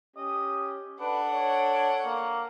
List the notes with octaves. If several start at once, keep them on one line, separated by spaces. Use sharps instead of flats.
C#4 G4 D#5
D4 A4 B4 F#5
C#5
A#3